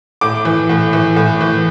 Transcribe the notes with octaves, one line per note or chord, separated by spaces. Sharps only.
A2 D6
E3
A2
E3
A2
E3